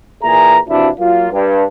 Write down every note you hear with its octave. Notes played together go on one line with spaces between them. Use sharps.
A#2 E3 G#4 E5 A#5
C3 E3 F3 D4 E4 F#4
F#3 A#3 F4
G2